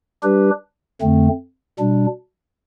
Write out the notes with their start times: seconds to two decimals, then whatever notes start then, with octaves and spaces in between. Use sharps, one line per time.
0.23 G3 D4 G4 B4
1.01 F2 D3 A3 C4
1.79 B2 G3 D4